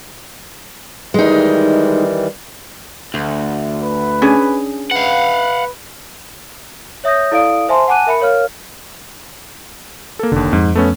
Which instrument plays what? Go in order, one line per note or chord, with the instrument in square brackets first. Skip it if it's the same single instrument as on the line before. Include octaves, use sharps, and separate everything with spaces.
[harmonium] D#3 E3 G3 [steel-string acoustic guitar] G#3 D#4
[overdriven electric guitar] D2
[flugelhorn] B4
[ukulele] C#4 D4 G#4
[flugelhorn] B4 [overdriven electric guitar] F5 F#5
[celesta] C#5 E5 D#6 G6 A#6
E4 A4 D5 F5 D#6 D7
C5 E5 G#5 A5 C6
F#5 G#5 A5 D6 F#6 D#7
A#4 E5 B5 C#7
A#4 C#5 F5 F6
[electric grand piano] A#3 A4
[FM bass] F1 [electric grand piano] D#2 D3
[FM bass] F2 [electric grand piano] G#2
[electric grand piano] A3 B3 C#4